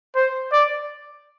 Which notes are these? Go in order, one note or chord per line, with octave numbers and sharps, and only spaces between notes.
C5
D5